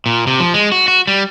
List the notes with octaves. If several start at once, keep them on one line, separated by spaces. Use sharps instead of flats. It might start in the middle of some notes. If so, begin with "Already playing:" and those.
A#2
C3
F3
G#3
F#4
F#4
G3